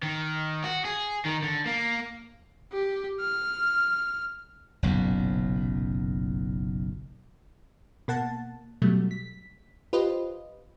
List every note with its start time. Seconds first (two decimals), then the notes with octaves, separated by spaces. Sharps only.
0.03 D#3
0.64 F#4
0.85 G#4
1.25 D#3
1.43 D3
1.66 A#3
2.72 G4
3.21 F6
4.83 F#1 B1 F#2 A#2
8.08 B2 A#3 F#5 A5
8.82 B2 F#3 G3 A3
9.11 B6
9.93 F4 G4 B4 C5 D#5